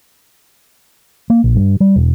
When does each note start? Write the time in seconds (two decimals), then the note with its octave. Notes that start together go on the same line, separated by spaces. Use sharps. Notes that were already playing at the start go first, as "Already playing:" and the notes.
1.30 A#3
1.44 A#1
1.56 G2
1.80 G3
1.96 E1